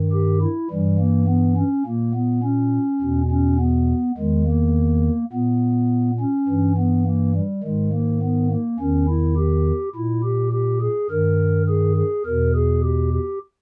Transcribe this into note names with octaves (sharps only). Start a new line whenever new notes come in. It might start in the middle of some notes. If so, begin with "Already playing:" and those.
Already playing: G2 D#3
G4
E4
G2 E3 G3
A#3
B3
C#4
A#2 A#3
B3
C#4
E2 B2
C#4
B3
E2 D#3 G#3
A#3
A#2 B3
C#4
G2 E3
B3
A#3
G3
G#2 D#3 G#3
A#3
B3
A#3
E2 D#3 C#4
E4
G4
A#2 E4
G4
G4
G#4
G2 D#3 A#4
G#4
G#4
E2 B2 A#4
G#4
G4
G4